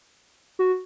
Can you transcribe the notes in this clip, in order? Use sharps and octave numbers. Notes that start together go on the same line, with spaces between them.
F#4